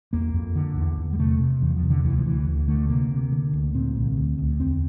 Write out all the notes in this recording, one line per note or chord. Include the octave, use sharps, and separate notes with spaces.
E2 A#3
F2
D3
E2
E2
G3
C3 A3
C3
E2 E3
F3
C3
D3
D2 E3
F3
D2 E3
D2
D3 A3
C3 A#3
C3
D3
D2
A#2 C4
C2
D2
D2
E2 C4